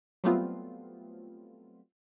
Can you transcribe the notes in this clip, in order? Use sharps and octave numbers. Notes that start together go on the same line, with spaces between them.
F#3 G3 A3 B3 C4 F4